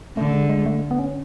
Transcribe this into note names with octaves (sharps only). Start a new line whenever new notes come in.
D3 A3
G#3
G#3
A3
B3
C#4